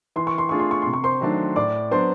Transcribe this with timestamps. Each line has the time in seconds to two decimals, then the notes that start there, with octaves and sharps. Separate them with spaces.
0.16 E3 C6
0.27 C#6
0.38 C6
0.49 A3 D4 F4 G#4 C#6
0.59 C6
0.71 C#6
0.82 C3 C6
0.93 C#6
1.04 C5 C6
1.21 D#3 F#3 A3 D4
1.56 A2 D5 D6
1.91 F#3 B3 D4 F#4 C5 C6